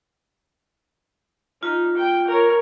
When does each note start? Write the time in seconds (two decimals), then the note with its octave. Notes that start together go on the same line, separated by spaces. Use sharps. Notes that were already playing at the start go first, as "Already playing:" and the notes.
1.63 D#4 F4
1.97 G5
2.28 A#4 C#5